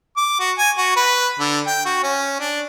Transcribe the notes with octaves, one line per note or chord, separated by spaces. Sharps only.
D6
F#4
G#5
F#4
B4
D3
G5
F#4
C#4
D4